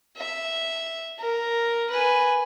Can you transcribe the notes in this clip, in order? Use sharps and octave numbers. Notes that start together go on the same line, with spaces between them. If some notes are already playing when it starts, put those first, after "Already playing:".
E5
A#4
B4 G#5